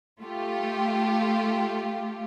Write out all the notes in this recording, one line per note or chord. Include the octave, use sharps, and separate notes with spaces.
A3 F4 G4